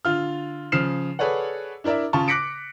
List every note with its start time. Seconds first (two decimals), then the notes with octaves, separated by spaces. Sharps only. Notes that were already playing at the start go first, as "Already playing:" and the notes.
0.05 D3 F4 F6
0.72 C#3 F3 F6 C7 E7
1.19 G#4 A4 B4 C#5 D5 F#5
1.84 D4 E4 A#4 D5 E5
2.13 C#3 F4 A5 C#6
2.28 D6 F#6 A#6 B6 C#7 D7